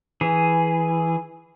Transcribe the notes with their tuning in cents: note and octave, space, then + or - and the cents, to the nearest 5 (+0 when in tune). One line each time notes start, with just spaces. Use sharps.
E3 +0 G#4 +0